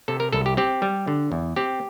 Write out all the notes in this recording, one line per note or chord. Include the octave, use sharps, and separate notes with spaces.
C3 A4
A#4
C2 A4
G4
C4 G4
G3
D3
E2
C4 G4